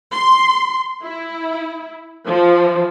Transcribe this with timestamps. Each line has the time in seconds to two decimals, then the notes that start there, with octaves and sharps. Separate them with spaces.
0.13 C6
1.04 E4
2.26 F3